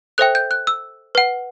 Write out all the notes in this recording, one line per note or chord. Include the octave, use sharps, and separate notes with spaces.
A4 C5 E5 G5 F#6
G6
F#6
E6
B4 F#5